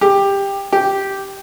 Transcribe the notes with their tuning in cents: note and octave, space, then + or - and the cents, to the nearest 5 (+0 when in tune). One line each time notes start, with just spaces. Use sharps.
G4 +15
G4 -5